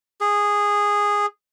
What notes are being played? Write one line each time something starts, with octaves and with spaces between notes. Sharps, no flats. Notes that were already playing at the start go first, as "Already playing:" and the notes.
G#4